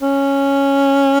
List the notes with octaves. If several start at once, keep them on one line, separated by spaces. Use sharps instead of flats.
C#4